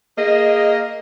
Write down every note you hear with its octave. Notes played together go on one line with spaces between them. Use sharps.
A#3 G#4 D#5